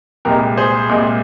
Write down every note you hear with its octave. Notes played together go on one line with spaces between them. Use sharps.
C2 A#2 G#3 G4 A#4
G#4 C5
C2 A#2 G#3